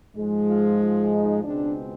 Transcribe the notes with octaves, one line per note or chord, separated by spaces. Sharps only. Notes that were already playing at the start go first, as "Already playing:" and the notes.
G#2 F3 G#3
F4
F4
D#4
C#2 B2 G#3 C4 D4